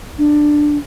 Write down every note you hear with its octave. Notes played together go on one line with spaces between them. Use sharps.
D4